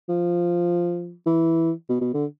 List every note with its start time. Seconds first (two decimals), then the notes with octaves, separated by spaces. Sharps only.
0.09 F3
1.26 E3
1.89 B2
2.01 B2
2.14 D3